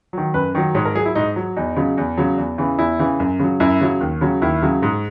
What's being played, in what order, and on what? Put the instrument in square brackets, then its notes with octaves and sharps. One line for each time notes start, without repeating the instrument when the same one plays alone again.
[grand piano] D#3 F#3
F#2 B4
D#3 F#3
G#2 C#5
A#4
F#3 G#4
E4
G#2 D#4
F#3
E2 D#4
C#3 F#3
E2
C#3 F#3
E2
C#3 E3
E2 E4
C#3 E3
F#2
C#3 F#3
F#2 E4
C#3 F#3
D#2
C#3 F#3
D#2 E4
C#3 F#3
G#2